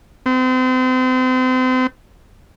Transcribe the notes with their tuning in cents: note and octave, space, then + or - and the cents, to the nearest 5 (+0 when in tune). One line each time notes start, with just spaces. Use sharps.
C4 -35